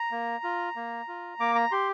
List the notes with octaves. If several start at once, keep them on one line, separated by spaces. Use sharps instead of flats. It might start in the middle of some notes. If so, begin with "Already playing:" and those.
Already playing: A#5
A#3
F4
A#3
F4
A#3 D6
A#5
G4 C6